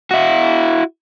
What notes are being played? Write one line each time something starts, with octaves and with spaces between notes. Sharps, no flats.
E4 F#4